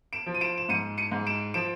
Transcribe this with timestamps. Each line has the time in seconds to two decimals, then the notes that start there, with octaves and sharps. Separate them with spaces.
0.13 D7 E7
0.26 F3
0.34 D#7
0.41 D7 E7
0.58 E7
0.69 G#2 C#7 D#7
0.98 C#7 D#7
1.12 G#2
1.27 D7 E7
1.54 F3 D7 E7